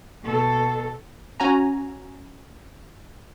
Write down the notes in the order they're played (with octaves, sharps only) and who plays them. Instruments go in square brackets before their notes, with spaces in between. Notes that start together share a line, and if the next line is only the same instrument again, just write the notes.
[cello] B2 A4
[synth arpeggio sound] C#4 F#4 G#5 A#5